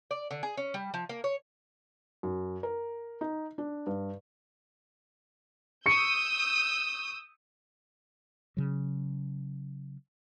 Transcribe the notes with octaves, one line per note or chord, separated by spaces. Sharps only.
D5
D3
G#4
C#4
G3
F3
A#3
C#5
F#2
A#4
D#4
D4
G2
C#6 D#6 E6 G6 C#7
C#3 F#3